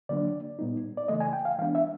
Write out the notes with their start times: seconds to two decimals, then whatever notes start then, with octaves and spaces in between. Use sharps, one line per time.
0.09 D3 F#3 A#3 D4 D5
0.59 A#2 G3 B3 D#4
0.97 D5
1.08 C#3 E3 A3 D#5
1.20 G#5
1.33 G5
1.45 F5
1.59 E3 G#3 B3 D4 F5
1.75 E5